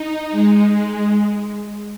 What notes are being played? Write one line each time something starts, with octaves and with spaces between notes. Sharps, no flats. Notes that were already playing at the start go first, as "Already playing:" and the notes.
Already playing: D#4
G#3
G#3